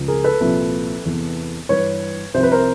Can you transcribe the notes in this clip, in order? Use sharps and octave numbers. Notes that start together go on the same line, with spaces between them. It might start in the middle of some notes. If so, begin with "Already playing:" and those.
Already playing: C#2 C#3 F3
G#4 A#4
A4 B4
C2 A#2 F3
E2 C3 E3
G2 E3 B4 C#5
C2 C3 F3 C5
B4
A#4 C5